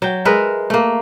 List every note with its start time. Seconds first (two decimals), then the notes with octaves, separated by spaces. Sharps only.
0.02 F#3 G5
0.25 G#3 A#4 B4 E5
0.70 A3 A#3